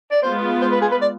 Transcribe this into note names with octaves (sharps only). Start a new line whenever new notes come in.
D5
G#3 B3 F4 C5
C5
B4
G#4
B4
D5